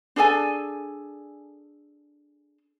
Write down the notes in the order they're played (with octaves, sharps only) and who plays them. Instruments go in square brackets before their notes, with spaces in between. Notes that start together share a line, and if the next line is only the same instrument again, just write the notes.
[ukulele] D4 G#4 A4 G#5